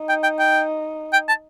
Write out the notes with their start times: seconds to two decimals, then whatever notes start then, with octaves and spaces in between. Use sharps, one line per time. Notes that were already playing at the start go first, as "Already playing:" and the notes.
Already playing: D#4
0.09 G5
0.23 G5
0.39 G5
1.13 G5
1.28 A5